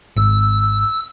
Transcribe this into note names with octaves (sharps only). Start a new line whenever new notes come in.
G#1 E6